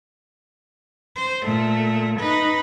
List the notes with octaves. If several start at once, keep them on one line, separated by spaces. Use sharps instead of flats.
C5
A#2 A3
D#4 B4